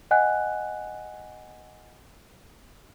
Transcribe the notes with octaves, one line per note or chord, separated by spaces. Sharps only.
D#5 F#5 G#5 F#6